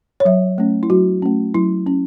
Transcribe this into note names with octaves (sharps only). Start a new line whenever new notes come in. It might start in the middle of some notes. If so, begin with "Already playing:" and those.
C#5
F#3 E5
A3 C#4
E4
F#3 F#4
A3 C#4
F#3 E4
C#4